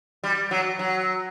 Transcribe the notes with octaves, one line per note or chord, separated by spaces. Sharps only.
G3
F#3
F#3